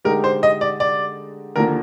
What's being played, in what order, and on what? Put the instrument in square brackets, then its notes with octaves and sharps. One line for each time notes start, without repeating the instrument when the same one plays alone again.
[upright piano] D3 G#3 D#4 G4 [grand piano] A#4
[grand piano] C5
D#5
D5
D5
[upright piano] D#2 D3 F3 A#3 [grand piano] A#4